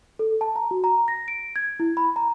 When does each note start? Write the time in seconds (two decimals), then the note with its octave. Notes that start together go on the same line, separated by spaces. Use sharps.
0.19 A4
0.41 A5
0.56 A#5
0.71 F#4
0.84 A#5
1.08 A#6
1.28 D7
1.56 G#6
1.80 E4
1.97 B5
2.16 A#5